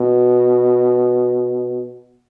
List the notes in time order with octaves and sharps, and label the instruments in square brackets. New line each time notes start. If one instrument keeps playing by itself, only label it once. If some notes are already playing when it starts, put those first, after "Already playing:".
Already playing: [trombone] B2